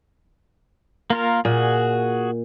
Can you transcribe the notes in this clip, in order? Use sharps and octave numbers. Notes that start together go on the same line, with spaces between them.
A#3 F4 A#4
A#2 F#4 G#4